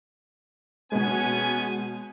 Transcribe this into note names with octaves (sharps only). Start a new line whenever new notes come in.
B2 G#3 B3 C#4 G#5